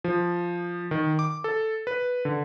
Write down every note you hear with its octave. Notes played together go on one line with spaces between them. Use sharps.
F3
D#3
D6
A4
B4
D3